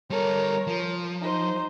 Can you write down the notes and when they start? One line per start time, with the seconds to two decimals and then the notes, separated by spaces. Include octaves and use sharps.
0.10 G3 A4 A#4 C#5
0.67 F3
1.21 D#4 C5